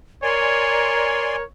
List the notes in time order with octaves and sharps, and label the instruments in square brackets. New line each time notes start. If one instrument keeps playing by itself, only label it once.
[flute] A#4 [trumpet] C#5 [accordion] D5 G#5 C6